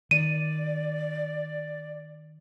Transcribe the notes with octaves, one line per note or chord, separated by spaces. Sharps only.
D#3 D5 D#7